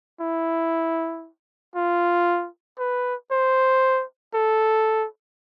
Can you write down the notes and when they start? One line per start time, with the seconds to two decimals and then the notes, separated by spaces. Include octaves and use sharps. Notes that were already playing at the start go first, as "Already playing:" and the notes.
0.21 E4
1.75 F4
2.79 B4
3.31 C5
4.34 A4